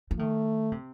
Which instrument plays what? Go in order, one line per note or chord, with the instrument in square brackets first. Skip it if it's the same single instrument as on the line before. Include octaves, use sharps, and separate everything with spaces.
[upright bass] F3
[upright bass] D#3 [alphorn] A3
[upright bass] C3